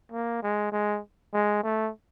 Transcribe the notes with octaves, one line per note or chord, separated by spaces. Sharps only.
A#3
G#3
G#3
G#3
A3